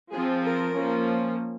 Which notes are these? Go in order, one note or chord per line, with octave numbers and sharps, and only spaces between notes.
F3 C4 G#4
A#4
F3 A#3 C#4